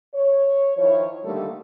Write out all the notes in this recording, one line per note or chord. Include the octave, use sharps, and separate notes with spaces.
C#5
D#3 F3 E4 C#5
D3 D#3 G3 A3 A#3 A4